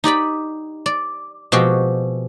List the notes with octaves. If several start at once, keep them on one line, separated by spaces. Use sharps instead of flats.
D#4 G4 D5 B5
D5
B2 F3 G#3 C4 F#4 G4